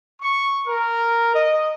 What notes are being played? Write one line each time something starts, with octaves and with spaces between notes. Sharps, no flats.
C#6
A#4
D#5